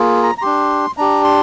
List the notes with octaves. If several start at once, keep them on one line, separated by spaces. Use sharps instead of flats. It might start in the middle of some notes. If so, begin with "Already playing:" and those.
Already playing: A#3 F4 G#4
A#5
A#5
D4 G4 C6
D4 G4 A#5
C6